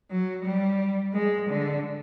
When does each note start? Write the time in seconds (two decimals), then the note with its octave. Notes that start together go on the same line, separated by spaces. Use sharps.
0.11 F#3
0.45 G3
1.14 G#3
1.49 D3